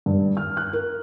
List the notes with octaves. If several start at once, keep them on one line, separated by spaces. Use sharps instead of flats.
G2
F6
F#6
A#4